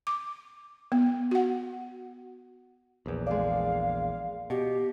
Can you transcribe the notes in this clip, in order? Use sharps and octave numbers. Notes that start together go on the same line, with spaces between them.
D6
B3
F#4 F#5
A#1 E2
G#3 D5 F5
B2 G4